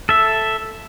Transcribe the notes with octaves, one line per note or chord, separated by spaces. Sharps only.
A4 E5